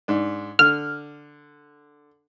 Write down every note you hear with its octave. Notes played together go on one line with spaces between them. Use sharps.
G#2 D4
D3 F6